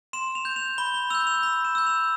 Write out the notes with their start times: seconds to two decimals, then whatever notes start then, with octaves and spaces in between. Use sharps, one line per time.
0.13 C6 E7
0.35 F7
0.45 G6
0.56 F7
0.78 B5 G7
0.94 G7
1.10 E6 G6 F7
1.27 F7
1.43 B5 F7
1.65 E7
1.75 E6 G6
1.87 F7